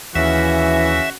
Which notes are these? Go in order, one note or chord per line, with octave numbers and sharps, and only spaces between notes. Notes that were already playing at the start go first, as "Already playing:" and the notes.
D#2 C#3 E3 C#4 F#4 E5